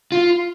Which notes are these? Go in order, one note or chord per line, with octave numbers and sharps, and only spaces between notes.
F4